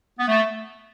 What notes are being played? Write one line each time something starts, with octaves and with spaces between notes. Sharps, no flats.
B3
A3